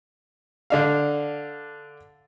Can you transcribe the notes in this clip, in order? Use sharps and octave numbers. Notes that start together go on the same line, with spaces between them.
D3 D4 F5